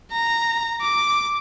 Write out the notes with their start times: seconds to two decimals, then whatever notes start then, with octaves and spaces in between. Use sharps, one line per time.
0.12 A#5
0.81 D6